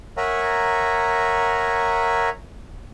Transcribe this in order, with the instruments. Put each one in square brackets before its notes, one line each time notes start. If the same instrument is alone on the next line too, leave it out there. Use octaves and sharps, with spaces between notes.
[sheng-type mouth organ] A#4 C#5 E5 F#5 G#5 A#5